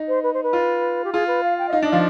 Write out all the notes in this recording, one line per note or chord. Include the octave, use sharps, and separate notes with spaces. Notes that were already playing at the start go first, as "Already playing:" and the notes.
Already playing: D#4
C5
B4
C5
B4
F4
G4
F4 G#4
B4
F5
G5
D#5
D#4 F5
D4 D#5
F3 F5